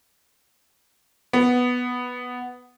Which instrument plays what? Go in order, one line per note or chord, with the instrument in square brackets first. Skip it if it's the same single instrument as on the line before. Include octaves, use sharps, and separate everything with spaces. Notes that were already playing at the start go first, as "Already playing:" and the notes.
[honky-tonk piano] B3